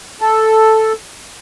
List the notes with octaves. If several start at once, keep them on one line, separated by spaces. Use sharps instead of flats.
A4